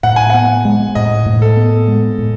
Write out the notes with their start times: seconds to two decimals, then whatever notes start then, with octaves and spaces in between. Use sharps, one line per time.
0.03 A2 F#5
0.16 G#5
0.30 B3 F#5
0.65 G#3
0.95 A2 D#5
1.26 A2
1.42 A4
1.57 B3
1.88 G#3
2.18 A2